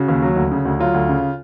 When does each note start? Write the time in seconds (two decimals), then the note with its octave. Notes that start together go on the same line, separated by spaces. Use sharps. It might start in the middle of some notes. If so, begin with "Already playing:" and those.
Already playing: C#3 F#4
0.08 D#2
0.22 F#3
0.37 D2
0.52 C#3
0.65 D2
0.79 F#3 F4
0.94 D2
1.09 C#3